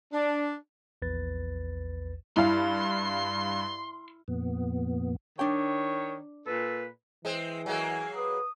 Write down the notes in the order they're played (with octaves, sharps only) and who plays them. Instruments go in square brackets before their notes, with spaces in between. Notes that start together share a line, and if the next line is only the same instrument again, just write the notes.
[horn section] D4
[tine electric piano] A#1 E2 B4 A6
[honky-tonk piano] G2 F5 [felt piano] E4 [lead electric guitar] C6
[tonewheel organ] F2 A#2 B3
[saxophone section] D#3 C#5 [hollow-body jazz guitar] D4 G5
[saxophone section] A#2 A4 B4
[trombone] E3 [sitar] G#3 C4
[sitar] F#3 G#3 A#3 [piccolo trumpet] G#5
[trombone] B4 [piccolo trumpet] D#6